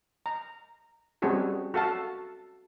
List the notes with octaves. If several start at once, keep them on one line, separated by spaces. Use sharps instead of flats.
A#5
G3 C4 C#4 F#4 G#4 A4
F#4 A4 F5 A5